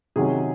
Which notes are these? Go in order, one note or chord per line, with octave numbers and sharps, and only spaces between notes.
C3 D#3 F#3 C#4 G#4